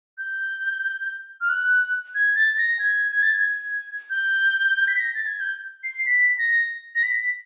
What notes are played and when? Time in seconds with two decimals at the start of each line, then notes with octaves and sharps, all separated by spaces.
0.18 G6
1.41 F6
1.49 F#6
2.15 G#6
2.35 A6
2.58 A#6
2.79 G#6
3.12 G#6
3.23 A6
3.34 G#6
4.10 G6
4.88 B6
5.00 A#6
5.14 A6
5.27 G#6
5.40 G6
5.84 C7
6.06 B6
6.38 A#6
6.95 A#6
7.03 B6